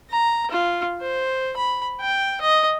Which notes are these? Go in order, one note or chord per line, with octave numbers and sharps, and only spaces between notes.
A#5
F4
C5
B5
G5
D#5